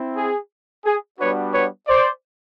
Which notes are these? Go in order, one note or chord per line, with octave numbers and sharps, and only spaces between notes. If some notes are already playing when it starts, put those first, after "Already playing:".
Already playing: C4 E4
G#4
G#4
G3 B3 D4 F#4 B4 C#5
B4 C#5
C5 D5